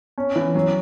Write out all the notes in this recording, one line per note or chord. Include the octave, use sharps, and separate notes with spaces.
C#4
E3
F#3